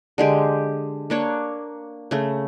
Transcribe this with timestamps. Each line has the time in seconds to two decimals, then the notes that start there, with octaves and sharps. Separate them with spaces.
0.18 D3 G#3 G4
1.10 A#3 D4 C#5
2.11 C#3 A3